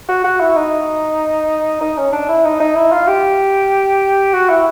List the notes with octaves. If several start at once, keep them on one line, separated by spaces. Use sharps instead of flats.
F#4
F#4
E4
D#4
D#4
C#4
D4
E4
D#4
D#4
E4
F4
G4
F#4
E4